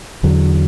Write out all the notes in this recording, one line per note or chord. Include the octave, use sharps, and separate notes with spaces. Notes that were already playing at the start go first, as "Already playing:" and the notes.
E2 D3 F#3